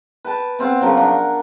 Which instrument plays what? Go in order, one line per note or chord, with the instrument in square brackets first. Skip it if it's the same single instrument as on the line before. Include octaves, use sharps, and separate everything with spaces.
[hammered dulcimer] B4 G5 A5
B3 C4 F5 F#5
C#3 F3 F#3 A#4
D4 F#5 G5